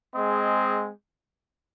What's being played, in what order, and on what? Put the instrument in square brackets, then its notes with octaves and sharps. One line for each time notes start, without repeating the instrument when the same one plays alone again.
[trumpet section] G#3 C4 G#4 D#5